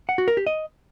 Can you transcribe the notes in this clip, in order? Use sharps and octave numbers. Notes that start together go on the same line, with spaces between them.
F#5
F#4
A#4
G4
D#5